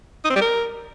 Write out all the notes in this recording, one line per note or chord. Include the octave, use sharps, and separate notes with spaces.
D#4
C4
G3
A#4